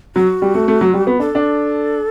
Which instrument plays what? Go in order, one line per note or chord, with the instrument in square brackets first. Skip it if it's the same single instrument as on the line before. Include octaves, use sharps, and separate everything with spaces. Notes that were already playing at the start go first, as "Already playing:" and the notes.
[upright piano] F#3 [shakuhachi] F#4
[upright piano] G3
A3
A3
F#3
G3
B3
[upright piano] D4 [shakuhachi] A4
[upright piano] D4